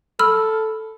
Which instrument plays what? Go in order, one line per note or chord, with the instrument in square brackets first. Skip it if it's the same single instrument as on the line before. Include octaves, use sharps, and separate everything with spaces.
[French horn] A4 [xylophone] B5 E6 F6